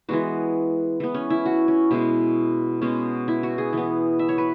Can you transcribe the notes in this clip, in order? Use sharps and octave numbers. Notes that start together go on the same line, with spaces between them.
E3 G#3 B3 F#4
E3 B3
C#4
E4
F#4
C#4
B2 G#3 B3 E4
B2 G#3 B3 C#4
E4
F#4
G#4
E3 B3
E5
C#5
B4